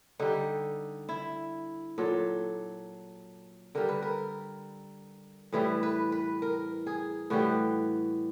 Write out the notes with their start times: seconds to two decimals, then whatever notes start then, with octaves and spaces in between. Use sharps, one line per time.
0.19 D3 G3 D#4
1.09 E4
1.98 A#2 F#3 A4
3.75 D3 G3 A#4
3.89 B4
4.02 A#4
5.52 A2 E3 G3 B4
5.83 B4
6.12 B4
6.42 A#4
6.86 G#4
7.30 A2 E3 G3 F#4